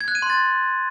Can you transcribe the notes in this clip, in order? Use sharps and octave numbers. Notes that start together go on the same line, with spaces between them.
G#6
F#6
D#7
C6
A6